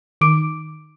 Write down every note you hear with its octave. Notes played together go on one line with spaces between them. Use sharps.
D#3 D6 D7